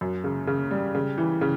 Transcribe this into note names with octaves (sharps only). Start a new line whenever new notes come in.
F#2
C#3
C#3
G3
C#3
E3
C#3